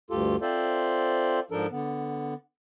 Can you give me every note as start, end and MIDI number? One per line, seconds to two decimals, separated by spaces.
0.10 0.36 38
0.10 0.36 43
0.10 0.36 65
0.10 0.36 67
0.10 0.36 69
0.42 1.40 60
0.42 1.40 65
0.42 1.40 69
0.42 1.40 72
0.42 1.40 74
0.42 1.40 76
1.51 1.67 44
1.51 1.67 53
1.51 1.67 62
1.51 1.67 69
1.51 1.67 70
1.72 2.34 50
1.72 2.34 59